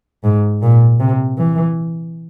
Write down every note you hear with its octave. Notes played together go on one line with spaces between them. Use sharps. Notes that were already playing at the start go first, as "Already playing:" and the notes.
G#2
A#2
C3
E3